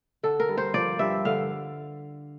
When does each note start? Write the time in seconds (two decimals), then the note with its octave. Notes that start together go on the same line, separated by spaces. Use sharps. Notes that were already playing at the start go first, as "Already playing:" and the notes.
0.23 D3 A4
0.40 A#4
0.49 G2
0.57 C5
0.74 F3 D5
0.99 G2 E5
1.25 D3 F5